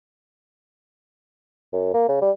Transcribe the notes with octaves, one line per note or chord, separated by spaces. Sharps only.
F#2
A#3
C#3
G3